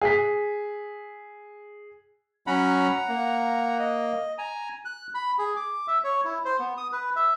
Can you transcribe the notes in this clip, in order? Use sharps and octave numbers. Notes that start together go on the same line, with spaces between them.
G#4 B6
F#3 C#4 F#5 A#5 B5
A#3
D#5
G#5 A#5
F#6
B5
G#4
D6
E5
C#5
E4
C5
B3
D#6
B4
E5